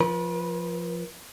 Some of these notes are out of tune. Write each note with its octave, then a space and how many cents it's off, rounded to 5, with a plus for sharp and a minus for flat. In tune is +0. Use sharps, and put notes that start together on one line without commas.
F3 +0 B4 -40